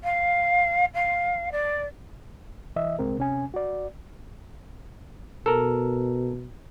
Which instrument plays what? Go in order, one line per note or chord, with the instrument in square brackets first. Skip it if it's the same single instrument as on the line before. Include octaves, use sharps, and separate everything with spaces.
[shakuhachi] F5
F5
D5
[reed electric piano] C2 E3 D#5 E5
C2 G#3 C4 A#4
C3 C#4 G#5
F#4 D5
[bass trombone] B2 [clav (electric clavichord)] A4 A#4